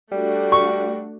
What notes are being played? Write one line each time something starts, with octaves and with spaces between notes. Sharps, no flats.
G3 A3 D4 F#4
C#6